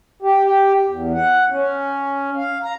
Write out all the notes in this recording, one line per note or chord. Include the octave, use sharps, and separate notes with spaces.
G4
G4
E2
F#5
C#4
F5
A#5